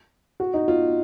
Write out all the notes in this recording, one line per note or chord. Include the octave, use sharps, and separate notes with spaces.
F#4
D#4
F4